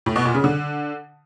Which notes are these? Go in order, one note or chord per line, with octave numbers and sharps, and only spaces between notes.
A2
B2
A#2
C#3
D3